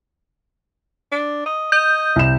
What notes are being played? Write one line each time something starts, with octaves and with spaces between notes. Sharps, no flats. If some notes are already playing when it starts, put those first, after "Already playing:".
D4
D#5
D#5 G6
C2 E7